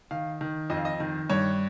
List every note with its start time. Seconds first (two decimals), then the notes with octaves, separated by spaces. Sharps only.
0.11 D#3 F5
0.41 D#3
0.70 F2 D#5
0.77 F5
0.85 D#5
1.00 D#3
1.30 G2 C#5